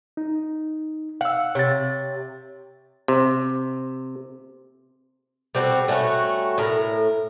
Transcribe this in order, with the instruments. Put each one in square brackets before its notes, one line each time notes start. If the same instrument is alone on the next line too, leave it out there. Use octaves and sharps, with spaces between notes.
[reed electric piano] D#4
[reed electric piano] F5 E6 [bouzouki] F#5
[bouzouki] C3 [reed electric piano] C#5 A6
[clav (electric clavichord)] C3
[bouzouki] G3 C4 F#4 A4
G3 A3 C#4 F#4
A2 A#4